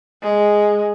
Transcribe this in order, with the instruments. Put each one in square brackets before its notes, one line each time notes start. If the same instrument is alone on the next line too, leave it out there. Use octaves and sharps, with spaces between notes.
[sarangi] G#3